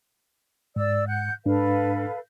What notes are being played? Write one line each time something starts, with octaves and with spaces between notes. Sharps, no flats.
G#2 D5 E6
F#5 F#6 G6
G#2 D4 A4 B4 F5